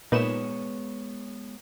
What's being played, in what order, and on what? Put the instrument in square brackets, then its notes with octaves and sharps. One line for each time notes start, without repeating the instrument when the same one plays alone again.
[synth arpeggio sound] A#2 [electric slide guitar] G#3 B3 C#5 [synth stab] D#4 B4 E7